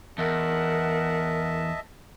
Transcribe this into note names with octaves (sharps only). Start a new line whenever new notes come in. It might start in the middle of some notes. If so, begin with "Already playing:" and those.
E2 A#4 D#5 E5 F#5 A5